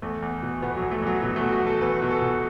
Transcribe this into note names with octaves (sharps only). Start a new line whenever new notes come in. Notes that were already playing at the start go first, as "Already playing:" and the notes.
E2 A3
E2
B2
B2 B3
F#3
E2
A3
E2 F#3
B2 F#3
B2 A3
F#4
E2
A4
E2 B4
B2
A4
B2